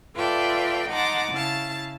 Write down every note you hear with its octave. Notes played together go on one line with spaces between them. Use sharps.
F4 A4 B4 D5 E5 G5
D#4 F#5 A5 C6 D6 A#6
C#3 E4 F5 A5 A6